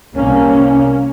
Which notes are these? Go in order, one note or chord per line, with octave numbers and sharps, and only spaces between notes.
C2 A#3 C#4